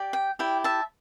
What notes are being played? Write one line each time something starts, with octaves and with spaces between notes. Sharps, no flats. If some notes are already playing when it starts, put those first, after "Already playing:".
Already playing: G4 D5
G5
E4 G4 D5 G5
E5 A5